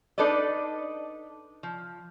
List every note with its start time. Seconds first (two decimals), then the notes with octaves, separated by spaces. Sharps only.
0.18 D4 D#4 A4 B4 D5 D#5
1.63 F3